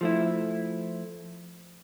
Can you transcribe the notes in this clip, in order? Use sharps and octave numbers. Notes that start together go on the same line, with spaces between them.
F3 A3 E4